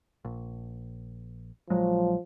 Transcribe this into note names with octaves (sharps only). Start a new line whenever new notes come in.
A#1
A#1 F3 F#3 G#3